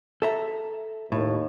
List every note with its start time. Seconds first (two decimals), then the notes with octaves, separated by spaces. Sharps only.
0.22 A4 E5 A#5
1.12 D#2 A2